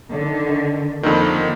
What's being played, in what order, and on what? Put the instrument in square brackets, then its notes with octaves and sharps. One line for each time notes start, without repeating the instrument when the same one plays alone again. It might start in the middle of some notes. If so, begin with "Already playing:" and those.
[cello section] D3 D#3
[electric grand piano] F2 D3 D#3 [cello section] A#3